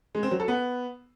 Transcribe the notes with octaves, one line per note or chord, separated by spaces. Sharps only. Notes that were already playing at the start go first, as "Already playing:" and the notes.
G#3
C4
F#3
A4
B3